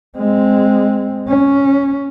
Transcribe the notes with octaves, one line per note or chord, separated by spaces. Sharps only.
G#3 C4
C#4